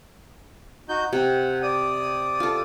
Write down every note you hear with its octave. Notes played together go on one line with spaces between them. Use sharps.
D#4 F#4 G6
C3 F#5
D5 D#6
F4 A4